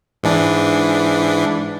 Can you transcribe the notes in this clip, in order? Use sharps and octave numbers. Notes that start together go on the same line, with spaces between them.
G#2 E3 D4